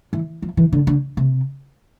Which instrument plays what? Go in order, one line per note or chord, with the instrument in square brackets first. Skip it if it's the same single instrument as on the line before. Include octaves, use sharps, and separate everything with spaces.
[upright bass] E3
F3
E3
D3
D3
C3